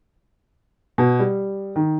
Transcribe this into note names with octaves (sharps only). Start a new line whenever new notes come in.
B2
G3
D#3